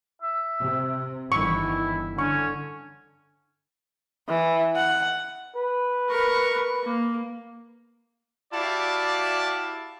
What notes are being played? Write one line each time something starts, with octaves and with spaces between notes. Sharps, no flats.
E5
C3
G1 D#3 E3 E4 C#6
D3 C#4 C#6
E3
F#5
B4
A#4 C#6
A#3
E4 F#4 G4 D5 F5 A5